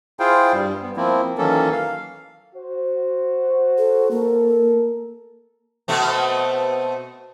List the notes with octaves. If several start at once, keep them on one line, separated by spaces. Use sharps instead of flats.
E4 F4 G#4 C5 F5 G5
G2 G3
B3
F3 A#3 C4 E4
D#3 E3 F#3 A#3 C#4 A4
F5
F#4 C5
A4
A#3 A4 A#4
B2 A3 C4